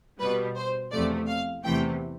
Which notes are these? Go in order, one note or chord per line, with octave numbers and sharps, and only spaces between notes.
B2 G3 B4
C5
E2 C3 F3 A3 D5
F5
E2 C3 E3 A3 G5